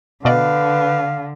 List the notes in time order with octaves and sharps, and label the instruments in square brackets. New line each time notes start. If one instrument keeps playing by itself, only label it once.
[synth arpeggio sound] B2 D5 D#5 [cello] D3 [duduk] B4 [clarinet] F5